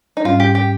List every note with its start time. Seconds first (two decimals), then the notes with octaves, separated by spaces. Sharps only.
0.17 D#4
0.25 G#2 G3 C#4 F4
0.40 G4
0.55 G4